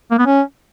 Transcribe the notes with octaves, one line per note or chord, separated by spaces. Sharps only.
A#3
B3
C#4